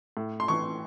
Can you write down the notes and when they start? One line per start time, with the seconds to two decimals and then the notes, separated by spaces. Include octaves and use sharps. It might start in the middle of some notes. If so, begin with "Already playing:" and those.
0.17 A2
0.40 C6
0.48 E3 C#6